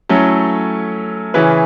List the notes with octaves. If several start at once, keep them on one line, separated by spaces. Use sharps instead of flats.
F#3 A3 C#4 E4 A4
C#3 E3 C#4 E4 B4